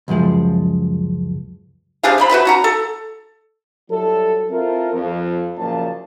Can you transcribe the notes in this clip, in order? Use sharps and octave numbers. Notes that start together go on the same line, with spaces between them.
C#2 F#2 F3 G#3
C3 D4 G#4 F5
C4 G#4 B5
F#4 B4 E5 G5
C#4 F#4 A#5
A4
F#3 G3 E4 A4
C4 E4 F4 A4 A#4
F2
F#1 A#2 F3 A5